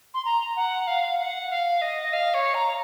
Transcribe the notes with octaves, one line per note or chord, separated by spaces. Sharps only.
C6
A#5
F#5
F5
F#5
F5
D#5
F5
C#5
A#5